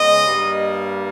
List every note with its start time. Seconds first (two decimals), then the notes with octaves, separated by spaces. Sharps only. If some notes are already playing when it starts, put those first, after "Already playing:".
Already playing: C#3 G#3 B3 D#5
0.26 G2 G3 A#3